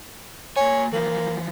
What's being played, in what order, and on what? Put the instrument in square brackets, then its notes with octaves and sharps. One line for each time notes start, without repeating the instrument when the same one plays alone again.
[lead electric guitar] A#3 G#5 [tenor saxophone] C#5
[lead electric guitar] E3 F3 [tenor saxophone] A#3